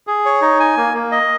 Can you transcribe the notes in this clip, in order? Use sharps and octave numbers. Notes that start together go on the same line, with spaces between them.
G#4
C#5
D#4
G#5
A#3
A#3
D#5